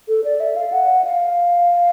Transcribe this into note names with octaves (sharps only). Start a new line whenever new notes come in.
A4
D5
E5
F5
F#5
F5